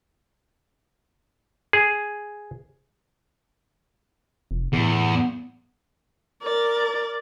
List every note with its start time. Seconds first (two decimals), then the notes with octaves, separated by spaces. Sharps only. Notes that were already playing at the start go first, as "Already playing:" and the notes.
1.73 G#4
4.51 F1
4.73 E2 A2
6.43 A#4 D5